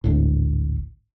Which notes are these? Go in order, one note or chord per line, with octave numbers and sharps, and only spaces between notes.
G#1 D2 A2